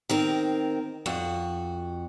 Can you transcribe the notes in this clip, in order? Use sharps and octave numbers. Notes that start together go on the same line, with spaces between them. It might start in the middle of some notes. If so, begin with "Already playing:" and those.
D#3 C4 A#4
F2 F#4